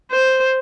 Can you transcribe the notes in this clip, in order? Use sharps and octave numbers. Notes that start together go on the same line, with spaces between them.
C5